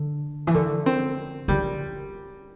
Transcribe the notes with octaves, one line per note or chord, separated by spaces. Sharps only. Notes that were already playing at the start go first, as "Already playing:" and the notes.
Already playing: D3
E3
D3 A3
C4
D3 G3